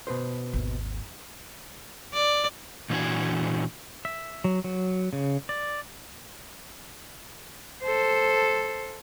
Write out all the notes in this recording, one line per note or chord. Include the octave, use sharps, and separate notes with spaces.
B2 B4 C5
G#1 D#2
D5
A#2 E3 D4 F#4 A#4 G#5
E5
F#3
F#3
C#3
D5
A4 C5